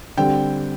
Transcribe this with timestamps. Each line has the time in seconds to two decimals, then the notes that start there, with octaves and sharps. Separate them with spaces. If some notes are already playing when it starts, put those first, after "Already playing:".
0.17 D3 G3 C4 G5